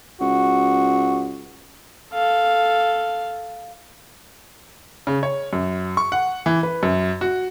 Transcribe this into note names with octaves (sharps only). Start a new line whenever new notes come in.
C#2 F#4
A4 F5
C#3
C#5
F#2
C#6
F#5
E3
B4
F#2
F#4